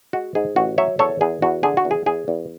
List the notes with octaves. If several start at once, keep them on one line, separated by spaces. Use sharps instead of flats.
G#3 F#4
G#2 G#4
A1 F#4
F#3 C#5 E5
E2 A4 C#5
E2 G#4
E2 F#4
D3 G#4
F#4
E2
G#4
E2 G#4
E2